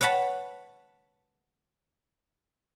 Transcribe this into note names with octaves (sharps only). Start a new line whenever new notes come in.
B4 C#5 F#5 A5 B5